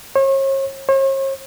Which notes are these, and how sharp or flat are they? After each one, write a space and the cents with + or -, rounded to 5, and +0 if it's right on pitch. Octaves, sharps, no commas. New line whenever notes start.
C#5 -40
C#5 -45